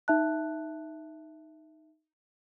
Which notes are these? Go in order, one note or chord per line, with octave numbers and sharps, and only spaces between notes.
D#4 E5 A5 F#6